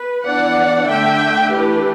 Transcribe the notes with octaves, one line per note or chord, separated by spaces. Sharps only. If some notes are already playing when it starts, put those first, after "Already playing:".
Already playing: B4
E3 B3 D4 D5 F#5
D3 A3 D4 E5 G5
E3 A3 D4 G4 B4